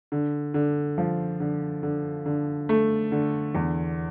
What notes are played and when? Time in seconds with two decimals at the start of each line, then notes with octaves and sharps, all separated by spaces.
0.12 D3
0.54 D3
0.98 F3
1.40 D3
1.83 D3
2.26 D3
2.69 A3
3.12 D3
3.55 E2